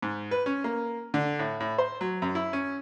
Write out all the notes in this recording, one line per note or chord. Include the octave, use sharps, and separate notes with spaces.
G#2
B4
C#4
A#3
D3
A2
A2
C5
F#3
F#2
E4
C#4